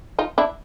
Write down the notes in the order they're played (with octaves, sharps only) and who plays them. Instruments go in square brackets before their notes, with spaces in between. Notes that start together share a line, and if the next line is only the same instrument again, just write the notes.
[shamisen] D#4 F4
D4 E4